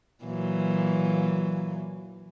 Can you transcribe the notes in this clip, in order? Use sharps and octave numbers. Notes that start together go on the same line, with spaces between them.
A#2 E3 F#3